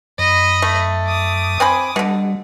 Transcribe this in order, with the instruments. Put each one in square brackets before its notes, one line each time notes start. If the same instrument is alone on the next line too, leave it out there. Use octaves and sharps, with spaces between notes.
[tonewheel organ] F#2 [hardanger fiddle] D#5 B5
[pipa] A3
[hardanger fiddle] D6 D#6
[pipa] C4 G#5 B5
[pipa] B2 D3 [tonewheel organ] G3